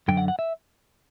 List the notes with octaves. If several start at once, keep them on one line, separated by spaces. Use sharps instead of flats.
F#2 D3 F#3 G5
F#5
F#5
E5